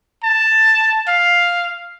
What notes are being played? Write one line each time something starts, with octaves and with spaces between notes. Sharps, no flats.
A5
F5